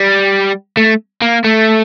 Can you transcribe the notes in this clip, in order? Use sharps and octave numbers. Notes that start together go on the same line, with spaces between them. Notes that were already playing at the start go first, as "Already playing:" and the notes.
Already playing: G3
A3
A#3
A3